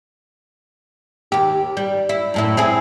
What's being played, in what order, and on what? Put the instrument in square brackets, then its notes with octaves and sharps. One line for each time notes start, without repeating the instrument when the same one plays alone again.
[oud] D#2 G4
G3
E4
F#2 A2 E4
C4 E4 G#4